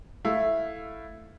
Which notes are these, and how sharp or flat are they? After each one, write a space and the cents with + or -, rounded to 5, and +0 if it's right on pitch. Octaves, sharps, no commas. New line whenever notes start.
A3 -5 E4 +0 F5 +0